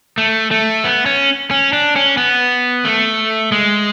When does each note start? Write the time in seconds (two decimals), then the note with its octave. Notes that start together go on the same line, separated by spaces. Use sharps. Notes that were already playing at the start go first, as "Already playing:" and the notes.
0.18 A3
0.51 A3
0.84 B3
1.06 C#4
1.51 C#4
1.73 D4
1.96 C#4
2.17 B3
2.85 A3
3.52 G#3